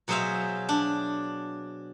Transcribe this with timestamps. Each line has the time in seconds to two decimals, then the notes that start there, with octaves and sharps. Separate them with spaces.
0.08 B2 F#3 G#4 C5 E5 F5
0.69 D4